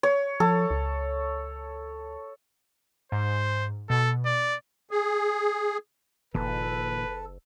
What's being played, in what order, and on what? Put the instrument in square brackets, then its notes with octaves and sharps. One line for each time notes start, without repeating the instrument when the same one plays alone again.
[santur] C#5
[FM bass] F3 [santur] A4
[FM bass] C#2
[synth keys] G#2 [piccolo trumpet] C5
[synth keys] B2 [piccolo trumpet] A4
[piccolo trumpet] D5
[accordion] G#4
[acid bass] F#1 [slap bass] A#2 D#3 F3 [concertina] A4 [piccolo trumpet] B4